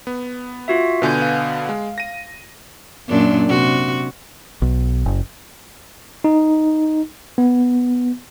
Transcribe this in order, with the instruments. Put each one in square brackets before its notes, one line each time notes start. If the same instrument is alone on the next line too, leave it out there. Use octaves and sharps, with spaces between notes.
[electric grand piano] B3
[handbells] F4 F#4 E5
[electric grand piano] B2 D3 B3 [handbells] B4 G#5 G6
[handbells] F5
[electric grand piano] G#3
A#6 D#7
[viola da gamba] F#2 A#2 D4
C3 F#4
[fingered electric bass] B1
F#1
[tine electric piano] D#4
B3